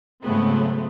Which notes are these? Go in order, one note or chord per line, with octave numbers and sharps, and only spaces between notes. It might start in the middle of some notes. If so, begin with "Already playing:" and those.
G#2 C#3 F#3 A3 B3 C4